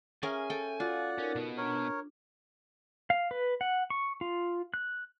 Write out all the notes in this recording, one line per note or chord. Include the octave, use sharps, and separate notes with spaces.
C#4 G#4 A#4 E5 G#5
A4 G5
F4 F#4 D5 F#5
C#4 D#4 A#4
B2 B3
D4 A#4 C#5
F5
B4
F#5
C#6
F4
F#6